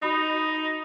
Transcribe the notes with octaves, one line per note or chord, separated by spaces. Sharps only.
D#4 F#4 B5 D#6